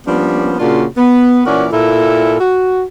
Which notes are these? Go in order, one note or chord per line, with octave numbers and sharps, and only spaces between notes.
F3 G3 A#3 B3 C#4 D4
A#2 C#3 A#3 D4 F4 F#4
B3
A#2 E3 C#4 F#4 A#4 D5
A#2 E4 A4
F#4